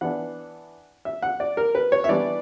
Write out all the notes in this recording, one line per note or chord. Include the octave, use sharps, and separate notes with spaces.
E3 B3 D4 F#5
E5
F#5
D5
A#4
B4
C#5
E5
E3 G3 B3 D4 D5